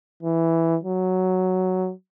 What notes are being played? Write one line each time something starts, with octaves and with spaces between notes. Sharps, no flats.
E3
F#3